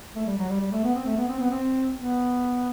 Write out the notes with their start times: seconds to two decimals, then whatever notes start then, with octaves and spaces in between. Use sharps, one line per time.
0.16 A3
0.27 G3
0.38 F#3
0.49 G3
0.61 G3
0.72 A3
0.84 B3
0.95 C4
1.06 A3
1.17 B3
1.28 C4
1.40 B3
1.51 C4
1.96 B3